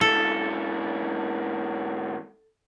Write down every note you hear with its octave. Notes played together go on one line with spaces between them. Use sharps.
G#2 E3 A4